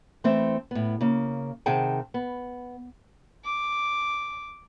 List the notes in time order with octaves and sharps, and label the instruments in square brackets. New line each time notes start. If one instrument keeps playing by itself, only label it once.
[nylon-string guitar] E3 A3 C4 C5 E5
A2 B3
C#3 A#3
C3 D#3 G#4 F#5 G5 A5
B3
[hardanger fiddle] D6